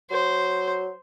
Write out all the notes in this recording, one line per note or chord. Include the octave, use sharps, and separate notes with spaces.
F#3 C5